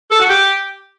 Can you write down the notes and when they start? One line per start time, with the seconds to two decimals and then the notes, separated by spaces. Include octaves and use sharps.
0.11 A4
0.20 F#4
0.29 G4